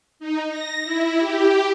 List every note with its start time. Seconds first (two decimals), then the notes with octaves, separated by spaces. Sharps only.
0.19 D#4
0.49 A#6
0.84 E4
1.19 G4